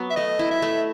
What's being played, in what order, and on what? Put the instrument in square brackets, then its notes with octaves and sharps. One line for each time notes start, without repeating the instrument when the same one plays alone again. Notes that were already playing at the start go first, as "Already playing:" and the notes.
Already playing: [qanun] F#3 B3
[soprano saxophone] E5
[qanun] A3 [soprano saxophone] D#5
[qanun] E4
[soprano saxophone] E5
[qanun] A3